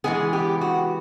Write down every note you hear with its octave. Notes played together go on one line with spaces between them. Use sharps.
E3 G#3 B3 G#4
G4
F#4